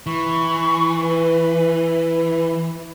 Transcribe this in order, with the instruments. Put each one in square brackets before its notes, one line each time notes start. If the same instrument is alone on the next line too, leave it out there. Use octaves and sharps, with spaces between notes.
[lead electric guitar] E3 [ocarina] C#6
[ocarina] B4